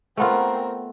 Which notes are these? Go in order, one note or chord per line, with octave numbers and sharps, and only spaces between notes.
A3 B3 C4 F4 A#4